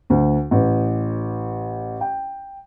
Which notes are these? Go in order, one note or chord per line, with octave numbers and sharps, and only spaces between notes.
D2
A1
G5